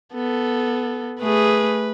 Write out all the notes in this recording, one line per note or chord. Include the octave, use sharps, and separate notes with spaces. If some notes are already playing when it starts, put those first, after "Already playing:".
B3 A4
A3 G#4 B4